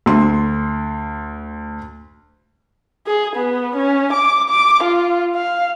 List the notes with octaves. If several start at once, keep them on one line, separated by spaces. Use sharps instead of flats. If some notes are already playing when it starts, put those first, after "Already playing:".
D2 C6
G#4
B3
C#4
D6
D6
F4
F5